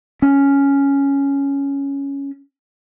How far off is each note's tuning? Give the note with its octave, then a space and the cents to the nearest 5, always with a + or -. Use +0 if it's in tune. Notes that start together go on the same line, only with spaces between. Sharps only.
C#4 +5